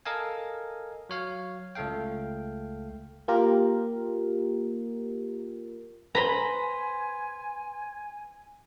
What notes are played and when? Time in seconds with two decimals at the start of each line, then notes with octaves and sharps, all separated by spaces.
0.06 A4 A#4 D#5 F5 G#5
1.09 F#3 C#5 F5
1.75 C#2 A3 A4 F5 G5
3.28 A#3 F4 G4 A#4
6.15 B4 C5 G#5 A#5 B5